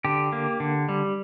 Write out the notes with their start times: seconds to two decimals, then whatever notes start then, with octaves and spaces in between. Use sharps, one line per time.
0.05 D3 G4
0.32 A#3
0.60 D3
0.89 G3